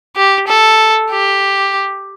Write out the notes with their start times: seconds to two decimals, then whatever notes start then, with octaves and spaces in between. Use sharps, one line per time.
0.16 G4
0.47 A4
1.10 G4